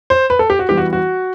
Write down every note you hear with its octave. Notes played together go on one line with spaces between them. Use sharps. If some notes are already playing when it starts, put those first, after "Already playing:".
C5
B4
A4
G4
F#4
E3 G3 B3 G4
F#4
F#4